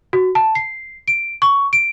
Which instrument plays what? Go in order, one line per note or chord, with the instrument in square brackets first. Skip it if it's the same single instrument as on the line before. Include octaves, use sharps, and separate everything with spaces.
[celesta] F#4
A5
C7
D7
C#6
D7